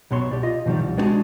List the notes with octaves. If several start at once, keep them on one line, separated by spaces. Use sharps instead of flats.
B1 B2 C#5 C6
B1 G4 D5
F4 D#5
B2 D#3 F3 G3
C2
G#3 B3 D4 F4 F#4 G#4